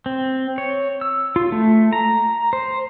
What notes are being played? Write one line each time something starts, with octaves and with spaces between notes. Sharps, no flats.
C4
C#5
E6
F4
A3
A#5
C5